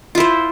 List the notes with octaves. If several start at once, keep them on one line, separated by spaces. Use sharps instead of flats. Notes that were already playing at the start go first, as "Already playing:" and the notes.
E4 F4 C5